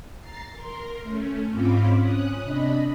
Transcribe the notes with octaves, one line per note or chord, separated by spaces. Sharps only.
A#5 A6 C7
A#4 C6
A3 C#4
G#2 C4 C#4 F4 B5 D6
C#4 D#6 F#6
C3 D4 D#5 B5